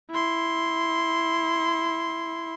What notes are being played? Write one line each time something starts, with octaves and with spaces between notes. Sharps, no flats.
E4 C6